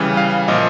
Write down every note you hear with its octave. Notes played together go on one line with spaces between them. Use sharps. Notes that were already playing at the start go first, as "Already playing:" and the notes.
Already playing: C#3 E3 G3
F5
A#2 F3 D#5